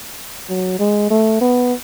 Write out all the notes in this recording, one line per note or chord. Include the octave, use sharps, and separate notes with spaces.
F#3
G#3
A3
B3